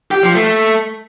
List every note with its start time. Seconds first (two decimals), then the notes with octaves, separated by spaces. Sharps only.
0.11 G4
0.23 F3
0.35 A3